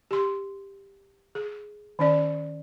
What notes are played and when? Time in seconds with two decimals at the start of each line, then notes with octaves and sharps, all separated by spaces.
0.11 G4 C6
1.35 G#4
1.99 D#3 C#4 D5